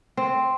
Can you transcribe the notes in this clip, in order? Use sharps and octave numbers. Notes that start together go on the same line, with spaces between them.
C4